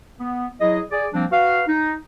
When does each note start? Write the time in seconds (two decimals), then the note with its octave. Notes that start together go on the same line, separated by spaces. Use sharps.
0.19 B3
0.60 F#3 E4 G#4 D#5
0.92 G#4 D5
1.14 F3 G3 A#3 C4 D4
1.31 F#4 B4 F5
1.67 D#4